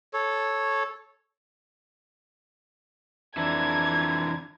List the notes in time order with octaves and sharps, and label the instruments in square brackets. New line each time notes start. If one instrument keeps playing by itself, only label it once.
[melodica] A4 C#5
[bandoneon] F2 D4 A#5 [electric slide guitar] D3 E3 E4 [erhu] G#6